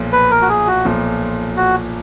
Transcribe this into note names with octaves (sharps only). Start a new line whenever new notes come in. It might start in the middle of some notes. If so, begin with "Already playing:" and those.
Already playing: B1 A#2 F3
B4
A#4
F#4
G#4
F#4
B1 A#2 F3
F#4